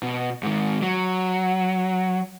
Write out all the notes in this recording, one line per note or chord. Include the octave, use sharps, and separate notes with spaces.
B2
G#2 D#3
F#3